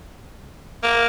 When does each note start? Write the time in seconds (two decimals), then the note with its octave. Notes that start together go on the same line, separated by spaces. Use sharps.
0.84 A#3